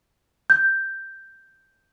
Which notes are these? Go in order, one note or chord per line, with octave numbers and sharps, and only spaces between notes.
G6